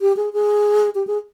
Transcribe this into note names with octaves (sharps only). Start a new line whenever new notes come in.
G4
G#4
G#4
G4
G#4